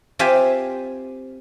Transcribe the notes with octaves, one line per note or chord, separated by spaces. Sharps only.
C4 F4 G4 E5 G#5